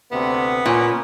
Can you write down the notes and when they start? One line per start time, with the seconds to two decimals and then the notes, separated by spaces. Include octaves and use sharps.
0.12 D2 C3 B3
0.66 A#2 C#4